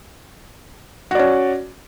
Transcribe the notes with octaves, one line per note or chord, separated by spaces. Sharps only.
C#4 F#4 D5